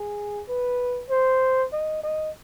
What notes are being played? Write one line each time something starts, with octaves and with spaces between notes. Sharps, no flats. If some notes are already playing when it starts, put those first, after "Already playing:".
Already playing: G#4
B4
C5
D#5
D#5